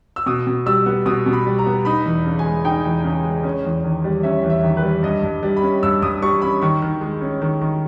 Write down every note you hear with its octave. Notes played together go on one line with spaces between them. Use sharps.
E6
B2 D#6
B2
G3 E6
B3
B2 D#6
B2
B5
G3
A#5
B3
D#4 B5
E2
C#3
G#5
G#3
D#4 G5
E2
C#3
G#3
C#4
E2
D#3
G3
C#4 E5
E2
E5
D#3
B4
G3
G2 D#5
G2
G3
B5
C#4
G2 E6
G2 D#6
G3 C#6
C#4 B5
D#3 C#6
D#3
G#3
C#4
D#3
D#3